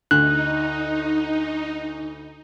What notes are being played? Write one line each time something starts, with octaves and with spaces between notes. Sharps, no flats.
D2 D#4 F#6